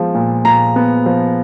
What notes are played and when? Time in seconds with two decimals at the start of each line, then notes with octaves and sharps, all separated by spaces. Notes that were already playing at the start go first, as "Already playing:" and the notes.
Already playing: F3 G#3 B3
0.15 A#2
0.45 A#2 A#5
0.76 B3
1.06 F3